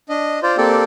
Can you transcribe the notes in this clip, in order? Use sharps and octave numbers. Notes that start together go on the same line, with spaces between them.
D4 D#5
F4 C5 D5
A#3 C4 G4 A4 D5